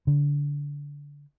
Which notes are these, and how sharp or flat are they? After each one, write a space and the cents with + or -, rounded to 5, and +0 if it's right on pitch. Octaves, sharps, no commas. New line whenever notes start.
D3 -25